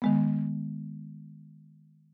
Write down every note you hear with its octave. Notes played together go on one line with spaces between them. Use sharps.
D#3 G#3 B3